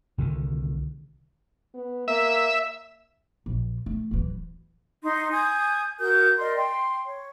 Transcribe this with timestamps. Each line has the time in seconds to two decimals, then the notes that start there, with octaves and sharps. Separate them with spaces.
0.18 C2 D3 D#3
1.75 B3
2.08 A#3 E5
3.46 A#1
3.86 A3
4.11 D1 E3
5.05 D#4 C6
5.32 G#5 D#6 G6
5.99 F#4 A#4 D#6 G6
6.38 A#4 D5 D#5 C6
6.56 G5 C6
7.05 C#5